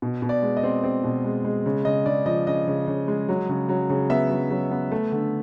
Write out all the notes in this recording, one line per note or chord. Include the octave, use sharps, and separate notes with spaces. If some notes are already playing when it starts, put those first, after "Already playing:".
B2
B2
D5
G#3
D#5
C4
C4
B2
G#3
G#3
C#3
C#3 D#5
C#3 D5
F3 D#5
C#3 D#5
C#3
C#3
G#3
F#3
C#3
F#3
C#3
B3 E5
F#3
F#3
B3
A3
D3